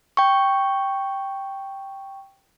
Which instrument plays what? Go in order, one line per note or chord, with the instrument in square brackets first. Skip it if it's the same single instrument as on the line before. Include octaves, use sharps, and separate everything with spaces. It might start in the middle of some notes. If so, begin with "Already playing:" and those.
[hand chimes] G5 C#6